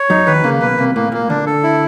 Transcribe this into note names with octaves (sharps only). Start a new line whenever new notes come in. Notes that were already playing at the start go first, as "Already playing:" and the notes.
Already playing: C#5
F#2 F#3 D#4
D#2 D#3 B4
C#2 C#3 A#3
B1 B2 B4
C2 C3 A#3
A2 A#3
A#2 A#3
D2 D3 D4
A4
E4